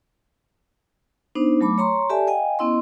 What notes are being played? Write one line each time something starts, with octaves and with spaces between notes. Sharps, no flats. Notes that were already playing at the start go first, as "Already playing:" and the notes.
B3 D4 D#4 C5
F#3 A3 B5 D6
C#5 A#5 C6 C#6
G4 A4 D5 E5 G#5 A5
D#5 F5 G5 G#5
B3 C#4 E4 D#5 C6